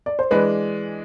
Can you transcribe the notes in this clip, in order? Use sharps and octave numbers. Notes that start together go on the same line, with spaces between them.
D5
C5
E3 G#3 D4 B4